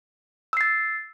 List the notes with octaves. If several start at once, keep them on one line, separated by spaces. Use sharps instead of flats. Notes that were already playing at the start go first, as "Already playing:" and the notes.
E6 A6 C7